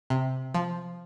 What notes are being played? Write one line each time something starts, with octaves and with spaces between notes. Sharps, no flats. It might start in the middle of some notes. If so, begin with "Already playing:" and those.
C3
F3